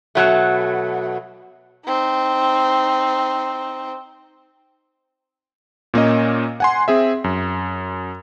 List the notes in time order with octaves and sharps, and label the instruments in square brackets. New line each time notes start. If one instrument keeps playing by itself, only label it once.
[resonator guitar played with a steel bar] B2 F#3 A3
[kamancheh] C4 D#4
[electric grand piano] A#2 A#3 C#4 D#5
F#5 G#5 C6
C4 G#4 E5
F#2